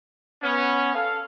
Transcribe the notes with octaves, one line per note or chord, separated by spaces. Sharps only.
B3 C#4
A4 F5